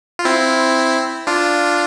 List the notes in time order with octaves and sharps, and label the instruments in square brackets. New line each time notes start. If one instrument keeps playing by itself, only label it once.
[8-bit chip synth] F4
C4 E4
D4 F4